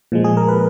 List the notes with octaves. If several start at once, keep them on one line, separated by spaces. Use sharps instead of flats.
A#2 F3 G#3
G#4
A#4
B4